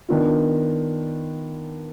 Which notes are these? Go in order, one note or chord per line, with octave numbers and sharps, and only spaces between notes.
D#3 B3 D4 F4